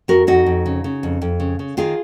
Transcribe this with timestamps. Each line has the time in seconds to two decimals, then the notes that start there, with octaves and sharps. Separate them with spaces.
0.08 F2 F#4 A#4
0.27 F2 D#4 F#4
0.46 F2
0.66 C#3
0.84 C#3
1.03 F2
1.22 F2
1.40 C#3
1.59 C#3
1.77 D#3 F4 G#4